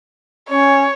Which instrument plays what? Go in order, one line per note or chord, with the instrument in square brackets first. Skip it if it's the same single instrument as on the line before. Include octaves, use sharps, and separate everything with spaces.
[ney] C#4 [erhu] C#5